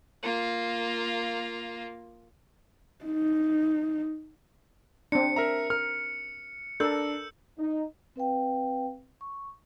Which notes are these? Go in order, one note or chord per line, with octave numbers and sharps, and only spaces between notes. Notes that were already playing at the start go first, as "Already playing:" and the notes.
A#3 F4
D#4
C4 D4 C#7
A#4 E5 A#5
A#4 F6
D4 A4 A#4 E6 G6
D#4
C4 B4 F5 G5
C#6